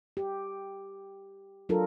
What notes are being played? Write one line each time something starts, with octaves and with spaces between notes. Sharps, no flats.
G4
F#3 D4 F4 A4 A#4